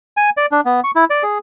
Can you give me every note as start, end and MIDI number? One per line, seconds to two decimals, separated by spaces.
0.17 0.30 80
0.37 0.46 74
0.52 0.61 62
0.65 0.80 59
0.84 0.91 85
0.96 1.05 64
1.10 1.23 74
1.23 1.38 68